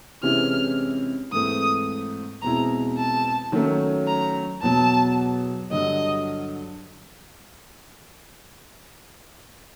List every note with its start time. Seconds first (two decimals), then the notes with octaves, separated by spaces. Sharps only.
0.23 C3 E3 G#3 C#4 E4 F6
1.33 G#2 E3 A3 C4 D#6
2.42 E2 B2 G#3 C4 E4 A#5
2.98 A5
3.52 D#3 F#3 A3 C#4
4.07 A#5
4.62 E2 B2 F#3 A5
5.71 G2 D3 F#3 D#5